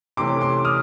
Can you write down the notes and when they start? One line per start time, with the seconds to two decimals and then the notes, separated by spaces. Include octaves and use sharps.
0.17 C3 E3 A3 C#4 C6 D6
0.41 C6 D6
0.65 D#6 F6